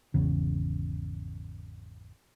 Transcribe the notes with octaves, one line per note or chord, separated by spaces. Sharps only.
G#1 E2 C#3